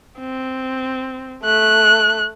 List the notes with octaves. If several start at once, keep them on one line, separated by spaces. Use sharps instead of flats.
C4
A3 F#6